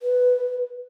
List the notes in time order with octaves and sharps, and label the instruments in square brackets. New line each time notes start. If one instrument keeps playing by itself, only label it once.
[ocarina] B4